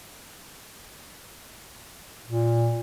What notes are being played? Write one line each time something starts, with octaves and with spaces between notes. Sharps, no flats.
A#2